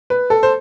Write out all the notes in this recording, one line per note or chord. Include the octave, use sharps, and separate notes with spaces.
B4
A4
C5